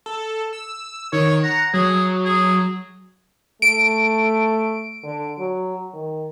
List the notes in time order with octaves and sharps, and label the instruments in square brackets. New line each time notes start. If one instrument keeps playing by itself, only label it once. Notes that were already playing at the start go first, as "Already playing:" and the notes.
[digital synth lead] A4
E6
[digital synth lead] D#3 [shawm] C#5
[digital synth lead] F#5 [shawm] A#5
[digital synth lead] F#3 [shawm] G#4
[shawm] G#4
[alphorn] A3 [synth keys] D7
[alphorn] D3
F#3
D#3